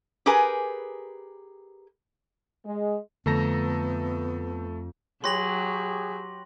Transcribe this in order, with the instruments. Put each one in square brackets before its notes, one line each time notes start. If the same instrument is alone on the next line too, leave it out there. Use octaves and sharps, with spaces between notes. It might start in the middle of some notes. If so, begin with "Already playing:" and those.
[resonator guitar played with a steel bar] G4 G#4 A#4 B4 G#5
[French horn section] G#3
[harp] F2 A#5 E7 [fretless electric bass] D3 [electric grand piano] A3 A4 A#6 [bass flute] B3
[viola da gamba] F#3 [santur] G4 B4 C#5 [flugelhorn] G#4 [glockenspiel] C6 A#6 F#7